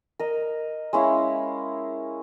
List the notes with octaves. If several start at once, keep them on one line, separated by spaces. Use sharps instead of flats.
A#4 D#5
G#3 C#4 E4 F5